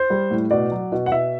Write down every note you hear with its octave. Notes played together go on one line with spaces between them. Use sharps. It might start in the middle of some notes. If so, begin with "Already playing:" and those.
Already playing: C5
G3
A2
B2 D5
F#3
B2
F#5
B2 E5